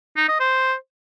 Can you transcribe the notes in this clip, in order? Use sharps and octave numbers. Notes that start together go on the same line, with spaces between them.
D#4
D#5
C5